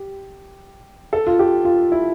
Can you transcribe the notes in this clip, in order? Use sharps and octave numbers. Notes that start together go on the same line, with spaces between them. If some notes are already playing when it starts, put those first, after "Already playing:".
Already playing: G4
A4
F4
G4
F4
E4